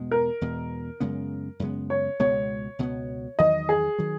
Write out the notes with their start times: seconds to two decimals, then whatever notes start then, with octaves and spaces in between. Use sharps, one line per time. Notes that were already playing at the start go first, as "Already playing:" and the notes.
Already playing: E2 B2 G#3
0.11 A#4
0.41 E2 B2 G#3
1.00 F#2 C#3 G#3 B3
1.59 F#2 C#3 G#3 B3
1.90 C#5
2.20 C#2 B2 G#3 B3 C#5
2.79 C#2 B2 G#3 B3
3.39 E2 D#3 F#3 D#5
3.69 G#4
3.98 D#3 F#3